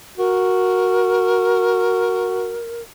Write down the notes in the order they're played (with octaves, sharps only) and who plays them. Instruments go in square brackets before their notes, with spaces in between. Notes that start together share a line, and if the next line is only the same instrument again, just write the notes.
[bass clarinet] F#4 [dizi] A#4